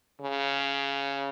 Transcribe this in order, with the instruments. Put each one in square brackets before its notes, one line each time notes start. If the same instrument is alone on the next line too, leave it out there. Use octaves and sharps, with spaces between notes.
[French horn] C#3